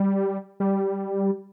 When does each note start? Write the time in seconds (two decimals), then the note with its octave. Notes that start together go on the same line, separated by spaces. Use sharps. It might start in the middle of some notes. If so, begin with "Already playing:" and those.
Already playing: G3
0.60 G3